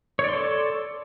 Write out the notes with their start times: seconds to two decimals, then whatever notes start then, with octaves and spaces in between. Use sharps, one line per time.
0.19 C#5
0.24 D5
0.29 C6
0.34 A4